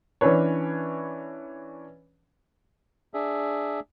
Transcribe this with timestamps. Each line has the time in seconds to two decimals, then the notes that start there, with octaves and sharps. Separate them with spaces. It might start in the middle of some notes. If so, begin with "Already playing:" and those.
0.21 E3 C#4 D4 B4 C#5
3.14 D4 G#4 E5